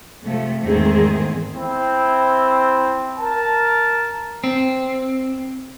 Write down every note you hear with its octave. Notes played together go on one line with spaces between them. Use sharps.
C3 F3 A3
E2 G#2 D#3 A3 C4 G#4
C4 E4
A#4 A5
C4